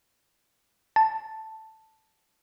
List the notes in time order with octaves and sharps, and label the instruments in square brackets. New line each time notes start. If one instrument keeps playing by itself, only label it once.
[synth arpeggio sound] A5